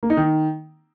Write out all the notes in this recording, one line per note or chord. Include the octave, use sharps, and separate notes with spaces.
A#3
D#4
D#3